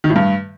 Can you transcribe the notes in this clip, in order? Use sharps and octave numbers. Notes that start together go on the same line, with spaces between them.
D#3
A2
G2